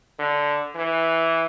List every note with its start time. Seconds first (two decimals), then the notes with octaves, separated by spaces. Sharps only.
0.19 D3
0.76 E3